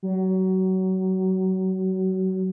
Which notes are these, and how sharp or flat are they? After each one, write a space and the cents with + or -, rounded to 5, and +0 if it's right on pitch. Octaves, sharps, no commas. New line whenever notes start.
F#3 +25